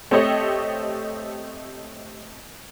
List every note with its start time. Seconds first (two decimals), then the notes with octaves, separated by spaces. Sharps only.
0.11 A3 C4 G4 A4 C#5 D#5